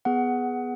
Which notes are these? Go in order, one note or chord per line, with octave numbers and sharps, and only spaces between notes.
B3 G#4 F#5